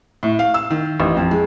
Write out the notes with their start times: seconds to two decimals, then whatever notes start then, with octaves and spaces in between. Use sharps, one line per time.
0.23 A2
0.39 F5
0.54 E6
0.70 D#3
1.00 A1
1.17 F2
1.31 G#3